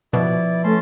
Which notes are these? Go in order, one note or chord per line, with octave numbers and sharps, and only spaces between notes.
B2 F3 E4 B4 D5
A3 C#4 A5 C6